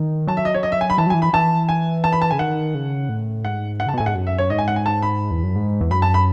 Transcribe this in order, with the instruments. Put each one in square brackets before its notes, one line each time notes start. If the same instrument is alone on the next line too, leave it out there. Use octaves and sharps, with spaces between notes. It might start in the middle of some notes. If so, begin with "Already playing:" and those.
Already playing: [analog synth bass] D#3
[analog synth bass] F#3 [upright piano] A5
[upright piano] E5
D#5
C#5
D#5
E5
G#5
B5
[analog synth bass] E3 [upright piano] A5
[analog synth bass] F#3
[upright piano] G#5
[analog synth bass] E3
[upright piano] B5
[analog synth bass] E3 [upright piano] A5
[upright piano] G#5
A5
B5
A5
[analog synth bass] C#3 [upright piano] G#5
[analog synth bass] D#3 [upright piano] F#5
[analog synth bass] C#3
A2
[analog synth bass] G#2 [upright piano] F#5
[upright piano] F#5
[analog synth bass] C#3 [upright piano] A5
[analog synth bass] B2
[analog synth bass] A2 [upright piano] G#5
[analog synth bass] G#2 [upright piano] F#5
[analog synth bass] F#2
[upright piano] E5
C#5
[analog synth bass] G#2 [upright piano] D#5
[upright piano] G#5
F#5
G#5
A5
B5
[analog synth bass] E2
F#2
G#2
E2
[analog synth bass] F#2 [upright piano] B5
[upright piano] A5
B5